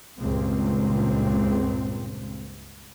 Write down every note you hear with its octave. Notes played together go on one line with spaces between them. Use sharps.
C#2 G2 A#2 C4